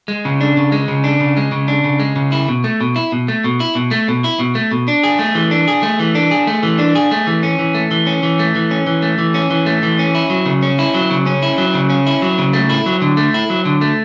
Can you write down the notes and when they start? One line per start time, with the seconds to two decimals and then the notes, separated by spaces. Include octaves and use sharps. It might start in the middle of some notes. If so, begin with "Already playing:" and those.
0.08 G#3
0.25 C#3
0.41 D4
0.57 C#3
0.72 G#3
0.88 C#3
1.04 D4
1.20 C#3
1.37 G#3
1.52 C#3
1.68 D4
1.84 C#3
2.00 G#3
2.16 C#3
2.32 E4
2.49 B2
2.64 A3
2.81 B2
2.96 E4
3.12 B2
3.28 A3
3.44 B2
3.60 E4
3.75 B2
3.91 A3
4.08 B2
4.24 E4
4.39 B2
4.55 A3
4.71 B2
4.88 D4
5.03 G#4
5.19 A3
5.35 E3
5.51 D4
5.68 G#4
5.83 A3
6.00 E3
6.15 D4
6.31 G#4
6.47 A3
6.63 E3
6.79 D4
6.95 G#4
7.11 A3
7.27 E3
7.43 C#4
7.59 E3
7.75 A3
7.91 E3
8.07 C#4
8.23 E3
8.39 A3
8.55 E3
8.71 C#4
8.87 E3
9.02 A3
9.18 E3
9.34 C#4
9.50 E3
9.66 A3
9.83 E3
9.99 C#4
10.15 E4
10.30 F#3
10.46 C#3
10.62 C#4
10.79 E4
10.95 F#3
11.10 C#3
11.26 C#4
11.43 E4
11.58 F#3
11.74 C#3
11.90 C#4
12.07 E4
12.22 F#3
12.38 C#3
12.53 A3
12.70 E4
12.86 F#3
13.02 D3
13.17 A3
13.34 E4
13.50 F#3
13.65 D3
13.81 A3